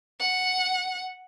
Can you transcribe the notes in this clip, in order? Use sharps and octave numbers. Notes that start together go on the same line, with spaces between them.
F#5